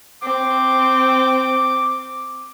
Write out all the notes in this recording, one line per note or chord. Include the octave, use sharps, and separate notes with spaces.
C4 D6